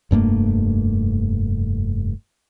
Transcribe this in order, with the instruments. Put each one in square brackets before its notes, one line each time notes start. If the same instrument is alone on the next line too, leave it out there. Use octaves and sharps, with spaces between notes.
[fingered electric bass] F1 G2 A3 A#3